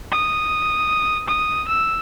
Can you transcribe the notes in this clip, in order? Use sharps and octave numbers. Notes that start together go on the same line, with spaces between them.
D#6
D#6
E6